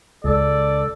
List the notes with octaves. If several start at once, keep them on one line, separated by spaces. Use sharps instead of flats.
C#2 A4 D5